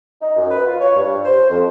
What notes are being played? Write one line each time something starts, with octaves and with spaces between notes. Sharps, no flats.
D#4
F#2
B4
F4
C#5
G2
C5
F2